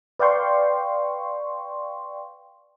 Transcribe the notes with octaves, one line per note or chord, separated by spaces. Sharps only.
B4 D5 F5 G5 C6 C#6